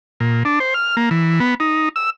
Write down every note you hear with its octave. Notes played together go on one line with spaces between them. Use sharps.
A#2
D4
C5
F6
A#3
E3
B3
D#4
E6